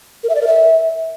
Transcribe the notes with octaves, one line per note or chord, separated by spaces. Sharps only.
A#4
E5
D5
A#4
E5